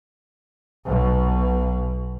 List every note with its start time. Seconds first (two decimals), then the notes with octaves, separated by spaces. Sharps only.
0.86 B1 B2